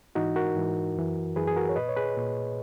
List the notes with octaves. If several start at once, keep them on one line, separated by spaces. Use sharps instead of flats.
G#2 E3 D#4 F#4
F#4 A#4
G#2 E3
F#2 E3
F#2 E3 G#4 B4
G#4
F#4 A#4
C#5
A#2 B4 D#5
C#5
G#4 B4
A#2